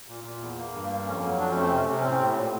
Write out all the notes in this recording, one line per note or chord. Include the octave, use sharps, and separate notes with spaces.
A#2
A#2
E2
A#3
G2
A#3
F2 C#4
F#3
F2 D4
C#4
A3
C4
C3 C#4
C3
C#4
A2 C4
A2
A#2